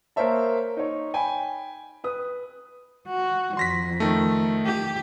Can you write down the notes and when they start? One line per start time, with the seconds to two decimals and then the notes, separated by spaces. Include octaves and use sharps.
0.16 A#3 A#4 C5 C#5 E5 A5
0.77 D#4 C#5
1.14 G5 G#5 B5
2.04 B4 D#6
3.08 F#4
3.57 F2 C6 A#6 B6
4.00 D#3 A3
4.66 G4